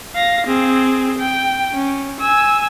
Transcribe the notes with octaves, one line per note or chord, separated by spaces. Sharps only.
F5 A#6
C4 G#4
G5
C#4
G#5 E6